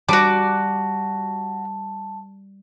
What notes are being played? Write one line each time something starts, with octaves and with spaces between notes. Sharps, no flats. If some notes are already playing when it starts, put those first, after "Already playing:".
G3 F#4 A5 D6